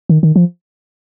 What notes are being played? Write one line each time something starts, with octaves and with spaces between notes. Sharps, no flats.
D#3
D#3
F3